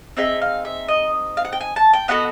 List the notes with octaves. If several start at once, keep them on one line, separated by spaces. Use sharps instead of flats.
C4 D#4 G#4 E5
F5
E5
D#5
F5
F#5
G5
G#5
A5
G5
B3 D#4 F#4 A4 F#5